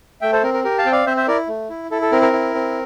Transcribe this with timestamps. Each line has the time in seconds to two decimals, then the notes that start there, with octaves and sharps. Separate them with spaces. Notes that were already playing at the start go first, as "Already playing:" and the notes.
0.21 A3 E5 G5
0.32 A4 C5
0.43 C4 A#4
0.54 A#4
0.64 G4 A#4
0.78 F5 A5
0.85 C4 G5
0.92 D5 F5
1.06 C4 C5 E5
1.17 C5 E5
1.28 E4 A#4 D5
1.48 A3
1.70 E4
1.91 E4 A4
2.02 A4
2.12 C4 A#4
2.22 A#4
2.33 E4
2.55 C4